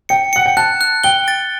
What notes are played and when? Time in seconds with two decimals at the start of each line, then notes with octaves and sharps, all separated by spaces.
0.09 G5 C#7
0.33 F#5 C#7
0.46 G5
0.57 A5 F#6
0.81 F#6
1.04 G5 G7
1.28 A6